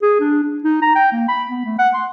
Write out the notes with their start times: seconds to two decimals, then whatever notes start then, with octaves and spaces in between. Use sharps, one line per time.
0.02 G#4
0.20 D4
0.43 D4
0.63 D#4
0.82 A#5
0.95 G5
1.12 A#3
1.28 B5
1.49 B3
1.65 A3
1.78 F#5
1.94 C6